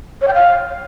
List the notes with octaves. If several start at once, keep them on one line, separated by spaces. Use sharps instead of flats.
C#5
G5
F5